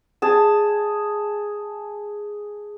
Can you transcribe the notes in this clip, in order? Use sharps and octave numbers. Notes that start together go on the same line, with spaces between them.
G#4 A5